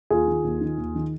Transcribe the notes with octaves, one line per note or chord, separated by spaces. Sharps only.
D#2 F4 G#4
D#3
D#2
D#3
D#2
D#3